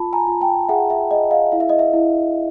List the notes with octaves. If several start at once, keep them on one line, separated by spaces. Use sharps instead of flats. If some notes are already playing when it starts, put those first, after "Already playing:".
Already playing: F4 A5 B5
G#5 A#5
F4
G5 A5
G#4 E5 F#5
E5
G#4 D#5
D#5 F5
E4 F5
E5
D#5
E5
E4